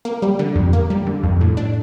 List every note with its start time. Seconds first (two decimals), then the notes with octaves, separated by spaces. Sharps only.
0.05 A#3
0.22 G3
0.39 D3
0.56 F2
0.73 A#3
0.90 G3
1.07 D3
1.24 F2
1.41 A2
1.57 D4